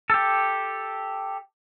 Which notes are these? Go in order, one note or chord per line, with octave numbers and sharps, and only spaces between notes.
G4 A4